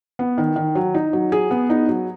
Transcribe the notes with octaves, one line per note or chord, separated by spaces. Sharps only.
B3
D#3
D#3
F#3
D#4
F#3
G#4
B3
D#4
F#3